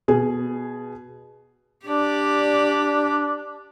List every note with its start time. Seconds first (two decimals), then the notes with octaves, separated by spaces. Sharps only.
0.08 B2 G#4
1.86 D4 G4 D5